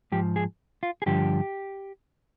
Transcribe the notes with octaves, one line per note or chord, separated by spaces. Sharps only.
G#2 F3 G4
G#4
F4
G#4
G2 D3 F3 G4